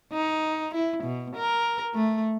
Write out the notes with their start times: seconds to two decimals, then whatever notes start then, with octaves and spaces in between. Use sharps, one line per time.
0.12 D#4
0.75 E4
1.04 B2
1.36 A#4
1.95 A3